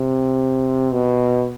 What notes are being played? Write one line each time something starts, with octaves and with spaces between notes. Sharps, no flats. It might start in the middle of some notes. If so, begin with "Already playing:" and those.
Already playing: C3
B2